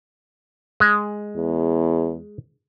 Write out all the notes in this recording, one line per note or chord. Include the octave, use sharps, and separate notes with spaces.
G#3
E2